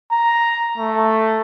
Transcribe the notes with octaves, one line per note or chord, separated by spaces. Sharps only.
A#5
A3